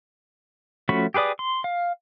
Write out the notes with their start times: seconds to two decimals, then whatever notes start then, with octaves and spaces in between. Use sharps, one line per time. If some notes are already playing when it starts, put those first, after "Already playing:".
0.89 F3 A3 C#4 F#4 B5
1.14 G4 G#4 B4 D5 D#6
1.39 C6
1.64 F5